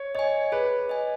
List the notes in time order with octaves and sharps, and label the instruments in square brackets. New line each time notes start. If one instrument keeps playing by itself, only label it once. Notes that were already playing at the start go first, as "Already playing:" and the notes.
Already playing: [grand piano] C#5
[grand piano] C#5 [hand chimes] D#5 G#5
[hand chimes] G#4 [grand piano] B4
[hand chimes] D#5 G#5